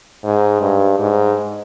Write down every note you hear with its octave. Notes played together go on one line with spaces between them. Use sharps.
G#2
G2
G#2